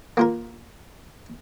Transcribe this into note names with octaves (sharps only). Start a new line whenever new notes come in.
A#3 F4 A#4